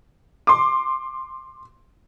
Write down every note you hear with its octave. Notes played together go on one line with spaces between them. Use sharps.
C6 D6